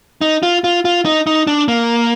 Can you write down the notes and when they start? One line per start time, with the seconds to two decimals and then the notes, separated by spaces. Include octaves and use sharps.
0.21 D#4
0.43 F4
0.64 F4
0.85 F4
1.05 D#4
1.27 D#4
1.47 D4
1.68 A#3